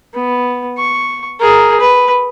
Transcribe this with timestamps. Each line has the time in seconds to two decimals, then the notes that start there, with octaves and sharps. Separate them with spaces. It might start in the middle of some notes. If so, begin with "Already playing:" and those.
0.14 B3
0.78 C#6
1.40 G#4 A#4
1.80 B4